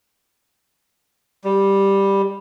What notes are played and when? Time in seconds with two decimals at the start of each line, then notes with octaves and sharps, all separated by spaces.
1.44 G3